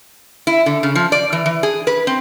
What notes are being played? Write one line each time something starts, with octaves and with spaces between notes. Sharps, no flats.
E4
D3
C#3
F3
D5
E3
E3
G#4
B4
C4